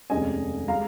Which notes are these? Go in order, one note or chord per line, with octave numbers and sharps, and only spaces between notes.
F1 D#2 D#3 G#3 C#4 D#5 G#5
G#3 F5 A#5